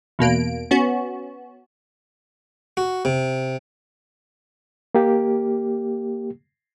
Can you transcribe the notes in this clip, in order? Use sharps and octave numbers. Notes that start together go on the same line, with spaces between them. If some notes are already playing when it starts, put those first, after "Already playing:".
E2 B2 A#3 D7
B3 C#4 F#4
F#4
C3
A#3 G4